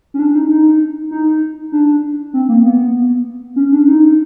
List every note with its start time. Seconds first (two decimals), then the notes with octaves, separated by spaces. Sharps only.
0.14 C#4
0.19 D4
0.34 D#4
0.50 D#4
1.11 D#4
1.72 D4
2.34 C4
2.49 A#3
2.65 B3
3.56 C#4
3.72 D4
3.87 D#4